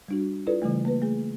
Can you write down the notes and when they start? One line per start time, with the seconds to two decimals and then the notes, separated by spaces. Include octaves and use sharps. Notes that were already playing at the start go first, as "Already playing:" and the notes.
0.08 G3 D4 F#4
0.47 E4 F4 A4 B4 D5
0.62 C#3 E3 G3 A3
0.85 A#3 B4
1.02 A3 G#4